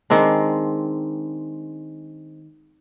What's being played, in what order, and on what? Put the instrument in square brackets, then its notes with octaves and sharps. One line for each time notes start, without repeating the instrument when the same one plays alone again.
[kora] D#3 G#3 C4 D4